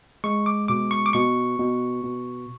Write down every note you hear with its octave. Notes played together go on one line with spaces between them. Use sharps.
G#3 C#6
D6
B2 D6
C#6
D6
B2 C#6
B2
B2